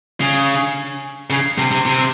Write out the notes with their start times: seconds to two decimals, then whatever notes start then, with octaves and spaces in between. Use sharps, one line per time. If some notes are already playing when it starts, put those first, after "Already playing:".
0.20 C#3
1.30 C#3
1.58 C3
1.71 C3
1.86 C3